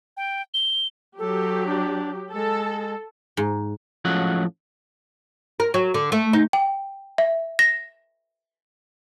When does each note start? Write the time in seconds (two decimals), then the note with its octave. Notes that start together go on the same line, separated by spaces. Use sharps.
0.17 G5
0.54 G7
1.19 F#3 G4 A4
1.66 D4
2.34 G#3 A4
3.37 G#2
4.05 A2 F3 F#3 G#3 C#4 F#5
5.60 A#4
5.74 F#3
5.94 D3
6.12 A3
6.33 D#4
6.53 G5
7.18 E5
7.59 A#6